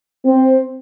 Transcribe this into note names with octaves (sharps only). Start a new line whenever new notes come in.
C4